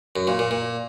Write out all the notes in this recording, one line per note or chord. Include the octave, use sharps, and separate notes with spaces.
F#2
A#2
A#2
A#2